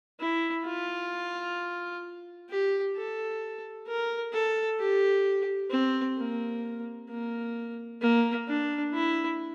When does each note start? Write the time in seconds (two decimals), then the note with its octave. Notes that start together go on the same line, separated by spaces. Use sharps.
0.20 E4
0.65 F4
2.50 G4
2.96 A4
3.87 A#4
4.33 A4
4.80 G4
5.71 C4
6.17 A#3
7.09 A#3
8.01 A#3
8.48 D4
8.94 E4